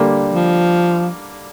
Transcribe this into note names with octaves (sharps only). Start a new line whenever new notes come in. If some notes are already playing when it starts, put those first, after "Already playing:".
Already playing: D3 G3 A#3
F3